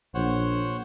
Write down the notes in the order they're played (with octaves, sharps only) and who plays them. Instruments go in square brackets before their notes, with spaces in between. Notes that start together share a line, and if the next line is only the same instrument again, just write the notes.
[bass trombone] A#1 [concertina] C5 C#5 F#5